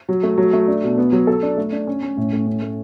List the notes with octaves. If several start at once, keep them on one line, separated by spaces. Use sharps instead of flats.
F#3
A3
F#3
A3
D4
B2
B3
F#3
A4
D4
A3
D4
C#4
C#4
A2
A3
C#4
A3